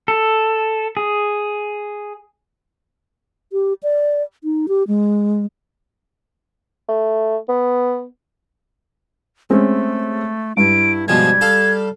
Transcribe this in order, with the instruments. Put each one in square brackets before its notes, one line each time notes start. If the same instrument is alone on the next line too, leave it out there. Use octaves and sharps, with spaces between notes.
[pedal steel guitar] A4
G#4
[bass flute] G4
D5
D#4
G4
G#3
[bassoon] A3
B3
[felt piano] G#3 C4 C#4 [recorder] A3
[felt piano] G2 [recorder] E4 [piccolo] D7
[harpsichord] B2 F3 G#3 [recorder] G3 [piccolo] G#6
[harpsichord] A4 F5